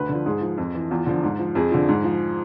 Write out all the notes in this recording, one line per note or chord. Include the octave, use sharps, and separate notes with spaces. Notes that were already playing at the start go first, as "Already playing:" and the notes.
Already playing: D2 B4
D3
F3
G#2 G#4
F3
F2
E3
E2 F4
D3 F3
G#2
F3
F2 G#4
D3 F3
G#2
F3